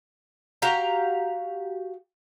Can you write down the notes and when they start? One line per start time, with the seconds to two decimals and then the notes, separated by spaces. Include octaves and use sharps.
0.62 F#4 G4 F5 A#5